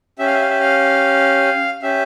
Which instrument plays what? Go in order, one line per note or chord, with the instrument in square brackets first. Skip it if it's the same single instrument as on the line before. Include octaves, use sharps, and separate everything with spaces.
[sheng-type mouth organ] C#4 G4 E5
F5
E5
F5
E5
F5
C#4 G4 E5